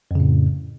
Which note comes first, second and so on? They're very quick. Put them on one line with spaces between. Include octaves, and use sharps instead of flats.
F2 C#3 A2